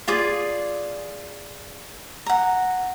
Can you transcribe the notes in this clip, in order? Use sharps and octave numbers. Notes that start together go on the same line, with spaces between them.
F4 G#4 D5
F#5 A#5